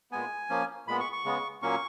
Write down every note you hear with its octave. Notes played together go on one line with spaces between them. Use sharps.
A#2 G#3 B3 G#5
F3 A#3 C#4
A#2 G#3 B3 B5
C#6
C#6
C#3 G#3 B3
A#2 F#3 A#3 C#4 C#6